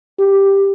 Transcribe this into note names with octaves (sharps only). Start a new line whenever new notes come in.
G4